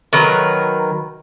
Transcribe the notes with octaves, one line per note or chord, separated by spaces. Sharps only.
D#3 F#3 A#4 B4